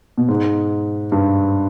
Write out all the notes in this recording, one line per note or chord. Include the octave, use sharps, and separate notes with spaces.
B2
G#2
G2